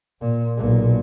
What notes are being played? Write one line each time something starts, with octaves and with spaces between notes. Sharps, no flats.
A#2
B1 A#2